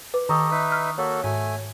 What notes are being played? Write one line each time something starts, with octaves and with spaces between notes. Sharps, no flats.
B4 D6
D#3 G4 A4 D#5 A#5 C#6 D#6
D#4 B4 E5
F6
A#3 F#4 A4 C#5
G#2 A3 G#5